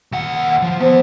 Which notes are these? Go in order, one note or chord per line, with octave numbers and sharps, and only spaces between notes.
D#2 F#5
F3
E3 B3 C5